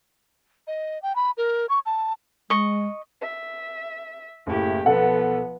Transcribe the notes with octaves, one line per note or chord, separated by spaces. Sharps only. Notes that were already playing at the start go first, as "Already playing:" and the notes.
D#5
G5
B5
A#4
C#6
A5
G#3 D#5 C#6
E5
F#1 A2 E4 G4
B1 F3 B3 A4 F#5